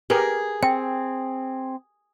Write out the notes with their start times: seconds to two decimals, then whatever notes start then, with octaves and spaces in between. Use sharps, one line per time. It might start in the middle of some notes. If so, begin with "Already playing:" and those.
0.10 G4 G#4 A#4 B4
0.63 C4 G5